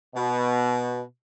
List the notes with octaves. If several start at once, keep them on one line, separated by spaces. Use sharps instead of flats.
B2